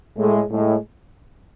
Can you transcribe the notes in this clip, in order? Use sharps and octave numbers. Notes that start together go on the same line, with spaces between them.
A2 G#3 A3
A2 G#3